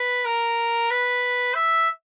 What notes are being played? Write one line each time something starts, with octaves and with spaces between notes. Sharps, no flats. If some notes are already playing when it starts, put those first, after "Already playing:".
Already playing: B4
A#4
B4
E5